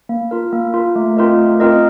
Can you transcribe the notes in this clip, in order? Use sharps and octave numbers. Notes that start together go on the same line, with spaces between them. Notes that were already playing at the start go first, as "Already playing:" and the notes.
A#3
F4 A#4
A#3
F4 A#4
A3
C4 F4 A#4 D#5
A3
C4 F4 A#4 D#5